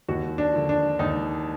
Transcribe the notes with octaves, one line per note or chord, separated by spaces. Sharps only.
D#2 F#4
D4
D3 F3
D4
D#2 D#4